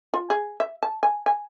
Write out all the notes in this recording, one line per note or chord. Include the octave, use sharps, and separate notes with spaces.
F4
G#4
E5
A5
G#5
G#5